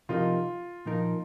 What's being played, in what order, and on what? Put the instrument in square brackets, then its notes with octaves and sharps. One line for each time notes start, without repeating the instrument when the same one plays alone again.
[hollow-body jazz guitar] C3 F3 D#4 A#4 D#5 [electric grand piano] F4
[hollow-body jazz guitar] A#2 F3 D#4 A#4